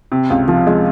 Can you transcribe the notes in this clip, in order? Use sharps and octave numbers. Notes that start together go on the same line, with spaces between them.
C3
C#2
F3
G#3